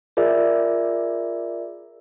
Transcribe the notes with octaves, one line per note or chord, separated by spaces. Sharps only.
F4 G#4 A#4 D5 E5